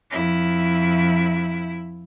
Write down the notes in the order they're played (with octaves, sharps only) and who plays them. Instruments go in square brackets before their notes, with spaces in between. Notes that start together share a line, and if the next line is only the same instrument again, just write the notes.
[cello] F2 E4